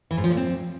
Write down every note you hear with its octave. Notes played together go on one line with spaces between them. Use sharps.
E3
G#2
F3
A#2
C4